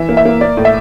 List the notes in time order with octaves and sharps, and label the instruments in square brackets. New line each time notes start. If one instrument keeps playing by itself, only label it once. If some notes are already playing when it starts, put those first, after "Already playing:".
Already playing: [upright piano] E3 E5
A#3
E5
A#3
A#3 D5
A2
E5